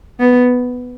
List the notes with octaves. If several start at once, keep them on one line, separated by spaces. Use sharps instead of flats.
B3